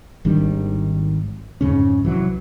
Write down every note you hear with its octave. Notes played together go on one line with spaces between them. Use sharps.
G#1 D#3 G3 D4
F2 G#2 C#3 C#4
C2 E3 F#3